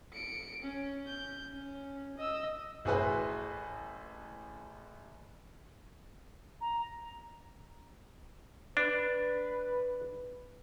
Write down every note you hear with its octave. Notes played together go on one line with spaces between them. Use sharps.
C#7 D7
C#4
G6
C#4
D#5 E6
A1 E4 F#4 G#4 B4 C5
A#5
D4 B4